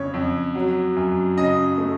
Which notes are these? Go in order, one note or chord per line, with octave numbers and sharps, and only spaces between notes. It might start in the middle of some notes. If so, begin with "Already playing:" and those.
Already playing: F2 C#3 C#5
F2
F#3
F#2
C#3 D#5
A3